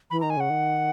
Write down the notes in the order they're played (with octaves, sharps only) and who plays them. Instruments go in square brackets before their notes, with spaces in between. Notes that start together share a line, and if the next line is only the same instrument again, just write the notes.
[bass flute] E3 [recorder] B5
[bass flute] D#3 [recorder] A#5
[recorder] G#5
[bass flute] C#3 [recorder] F#5
[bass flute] D#3